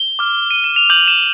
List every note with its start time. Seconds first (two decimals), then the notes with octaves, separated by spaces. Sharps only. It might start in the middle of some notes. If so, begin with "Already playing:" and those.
Already playing: G7
0.19 D6 F6
0.51 D#7
0.64 E7
0.76 F7
0.90 D6 G6 F#7
1.08 E7